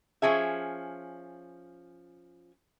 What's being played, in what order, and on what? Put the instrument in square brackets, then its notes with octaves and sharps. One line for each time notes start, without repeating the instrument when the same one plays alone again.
[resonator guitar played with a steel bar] F3 C#4 G#4 E5